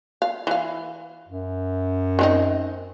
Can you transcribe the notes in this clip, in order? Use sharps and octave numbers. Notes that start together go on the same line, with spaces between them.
F5
E3 F5
F#2
D#3 C4 D#4